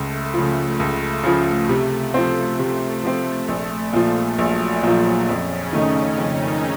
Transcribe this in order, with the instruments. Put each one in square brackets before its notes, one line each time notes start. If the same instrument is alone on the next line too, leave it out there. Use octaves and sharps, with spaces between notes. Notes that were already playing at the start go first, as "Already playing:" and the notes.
Already playing: [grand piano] C#2 [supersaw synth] A3
[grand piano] C#3 F3
C#2
C#3 F3
C3
F3 C4
[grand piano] C3 [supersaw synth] A3
[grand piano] F3 C4
A#1
A#2 F3
[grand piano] A#1 [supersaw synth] F#3
[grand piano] A#2 F3
[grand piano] F2 [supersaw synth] C#3 C#4
[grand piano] D#3 A3 D#4
[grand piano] F2 [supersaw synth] D#3 D#4